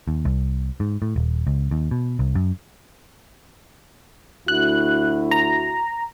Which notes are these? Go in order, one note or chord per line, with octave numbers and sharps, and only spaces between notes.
D#2
C2
G#2
A2
D#1
C#2
D#2
B2
C2
F#2
D2 E4 F#4 F#6
A#5